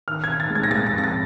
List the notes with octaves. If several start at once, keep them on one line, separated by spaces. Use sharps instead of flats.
D#3 F6
D#3 G#6
A6
G#3
G#6
A#6
G#3 A6
A#6
F2
A#6
A6